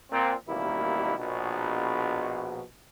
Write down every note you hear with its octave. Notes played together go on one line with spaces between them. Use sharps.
A#2 C4
A1 D#2 B2 G3 A#3 E4
A#1 B2